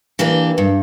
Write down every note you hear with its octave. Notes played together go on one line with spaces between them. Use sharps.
E3 A#3 D4 G4
G2